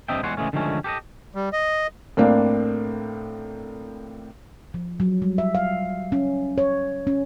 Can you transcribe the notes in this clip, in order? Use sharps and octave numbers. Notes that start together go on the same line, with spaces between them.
G2 D3 C4 D#5 E5 G5
E2 G3 G#3 C#5 F#5 C6
C#3 E3 G#3 A3 C#4
D3 D#3 F3 G#3 A3 C#4
G4 A4 B4 D#5
G3
D#5
A2 A#3 C4 D4 F5
F3
F#3
G3
E5
F5
C#4
C#5
C#4